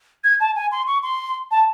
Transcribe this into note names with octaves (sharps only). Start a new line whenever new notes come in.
G#6
A5
G#5
C6
C#6
C6
A5